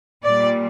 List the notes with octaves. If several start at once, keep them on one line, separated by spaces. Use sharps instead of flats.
A#2 G3 D5